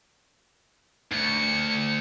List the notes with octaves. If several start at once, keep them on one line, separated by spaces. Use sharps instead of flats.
D2 C#7